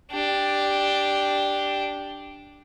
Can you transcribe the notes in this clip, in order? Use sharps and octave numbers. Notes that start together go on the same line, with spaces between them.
D4 G4